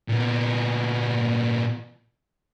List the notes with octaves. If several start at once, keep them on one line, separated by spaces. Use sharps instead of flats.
A#2 B3